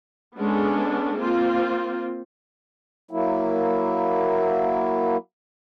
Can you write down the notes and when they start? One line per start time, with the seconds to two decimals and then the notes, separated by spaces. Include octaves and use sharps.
0.37 G#3 B3 C#4 D4 G#4 A4
1.19 A#3 C4 F4
3.11 F#3 A#3 E4